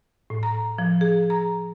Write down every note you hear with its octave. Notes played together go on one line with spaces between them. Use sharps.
A2
A#5
F3
G#4
A#5